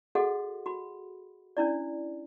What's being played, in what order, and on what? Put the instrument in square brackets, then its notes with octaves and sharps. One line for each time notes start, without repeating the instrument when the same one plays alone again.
[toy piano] F#4 G#4 A4 D#5 F#5
F#4 B5
C#4 D4 E4 D5